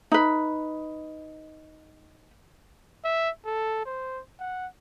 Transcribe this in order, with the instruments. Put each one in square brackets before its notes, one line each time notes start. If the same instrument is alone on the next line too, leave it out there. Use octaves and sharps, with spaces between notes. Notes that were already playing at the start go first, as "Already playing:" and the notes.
[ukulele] D#4 B4
[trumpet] E5
A4
C5
F#5